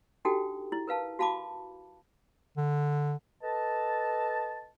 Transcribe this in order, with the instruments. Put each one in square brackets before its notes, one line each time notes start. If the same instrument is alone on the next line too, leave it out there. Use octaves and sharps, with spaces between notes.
[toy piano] D4 D#4 F#4 G4 A4 G5
E4
A#4 B4 F5 A5
F#4 F5 A5 B5 D6
[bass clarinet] D3
[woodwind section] A4 B4 D#5 A5